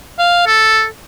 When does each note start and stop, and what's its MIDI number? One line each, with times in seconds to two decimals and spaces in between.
0.19 0.44 77
0.47 0.85 69